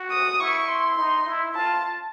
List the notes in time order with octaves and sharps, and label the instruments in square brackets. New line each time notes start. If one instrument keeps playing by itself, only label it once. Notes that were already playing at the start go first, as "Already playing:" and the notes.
Already playing: [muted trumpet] F#4
[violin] D#6
[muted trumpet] E4 [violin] C#6
[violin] C6
[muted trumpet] D#4 [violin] C6
[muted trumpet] E4
[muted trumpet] F4 [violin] A5